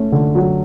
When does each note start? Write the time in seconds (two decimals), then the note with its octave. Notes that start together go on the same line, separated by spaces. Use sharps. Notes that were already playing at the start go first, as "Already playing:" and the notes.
Already playing: A3 C#4
0.12 D3
0.35 F#3